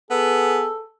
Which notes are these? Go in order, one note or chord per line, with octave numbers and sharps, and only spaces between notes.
B3 G#4 A4